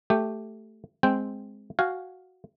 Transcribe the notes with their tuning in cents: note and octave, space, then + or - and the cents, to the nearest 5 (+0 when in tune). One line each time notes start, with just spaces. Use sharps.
A3 +0 G4 +0
G#3 +0 C4 +0 G5 +0
F#4 +0 F5 +5 G#5 +0